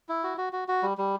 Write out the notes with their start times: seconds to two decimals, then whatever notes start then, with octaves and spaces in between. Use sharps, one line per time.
0.09 E4
0.24 F#4
0.38 F#4
0.53 F#4
0.68 F#4
0.83 G3
0.98 G3